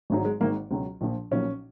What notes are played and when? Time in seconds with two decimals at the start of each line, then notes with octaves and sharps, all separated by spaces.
0.10 G#1 G#2 F#3
0.25 G#3
0.41 G#1 G#2 D#3 A#3
0.71 C#2 B2 F#3
1.01 A#1 A#2 F3
1.31 B1 A#2 F3 C#4